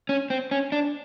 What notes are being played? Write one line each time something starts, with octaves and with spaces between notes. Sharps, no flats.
C#4
C4
C#4
D4